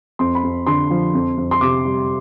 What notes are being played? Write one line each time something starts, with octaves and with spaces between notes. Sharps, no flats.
F2 C6
B5
F2
D3 C6
F3
F2
F2
C6
C3 D6
G3